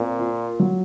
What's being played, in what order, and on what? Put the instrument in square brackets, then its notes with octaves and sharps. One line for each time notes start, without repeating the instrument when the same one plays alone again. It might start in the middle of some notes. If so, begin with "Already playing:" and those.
Already playing: [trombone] A#2 [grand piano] C4
[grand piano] F4
F#3